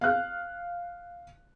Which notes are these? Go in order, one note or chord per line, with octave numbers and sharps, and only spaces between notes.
F5 F#6